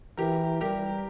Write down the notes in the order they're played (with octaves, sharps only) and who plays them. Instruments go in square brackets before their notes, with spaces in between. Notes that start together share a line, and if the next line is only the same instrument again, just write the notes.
[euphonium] E3 [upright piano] G4 A#4
[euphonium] G3 [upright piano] G4 A#4